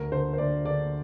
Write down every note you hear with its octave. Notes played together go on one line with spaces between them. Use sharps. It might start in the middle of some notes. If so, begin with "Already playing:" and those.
Already playing: D2 A#4
D3 C5
C5
D2 D5
D3 D5